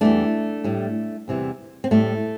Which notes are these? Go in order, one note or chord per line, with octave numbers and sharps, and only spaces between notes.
E2 E3 G3 A3 D4
A2 G3
E2 C3 E3 G3
C4
A2 G3 A3